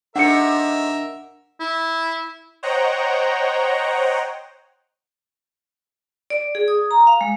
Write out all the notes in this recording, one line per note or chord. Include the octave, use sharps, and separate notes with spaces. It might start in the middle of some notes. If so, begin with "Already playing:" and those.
C3 A3 D4 D#4 A#4 E5 F#5 C#7
E4
C5 C#5 D#5 F#5 G5 A#5
D5
G#4
D#6
A#5
F5
G#3